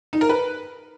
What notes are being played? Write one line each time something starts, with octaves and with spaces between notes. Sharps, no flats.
D#4
A#4
B4